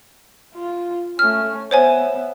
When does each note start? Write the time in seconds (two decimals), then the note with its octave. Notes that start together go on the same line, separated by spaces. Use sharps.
0.55 F4
1.19 A3 C#4 F6
1.71 B3 C5 C#5 E5 G#5